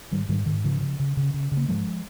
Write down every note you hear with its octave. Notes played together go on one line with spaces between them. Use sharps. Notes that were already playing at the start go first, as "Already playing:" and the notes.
G#2 D#3 G3
G#2 D#3 G3
G#2 D#3
C#3 F3
C#3
C#3
C#3
C#3
C#3
A#3
G#2 F3 G#3